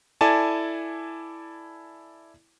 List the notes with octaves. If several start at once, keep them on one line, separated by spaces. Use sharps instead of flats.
E4 A4 D5 G#5 A5